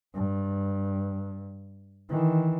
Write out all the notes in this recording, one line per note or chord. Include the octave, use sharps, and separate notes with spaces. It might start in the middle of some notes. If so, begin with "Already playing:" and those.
G2
D#3 E3